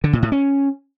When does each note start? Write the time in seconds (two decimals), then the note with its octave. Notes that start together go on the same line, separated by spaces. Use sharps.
0.04 D3
0.13 A#2
0.22 A2
0.32 C#4